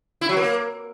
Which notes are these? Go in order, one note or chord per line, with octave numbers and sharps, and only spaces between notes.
E4
F#3
A#3